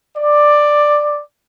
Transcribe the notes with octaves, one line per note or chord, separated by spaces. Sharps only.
D5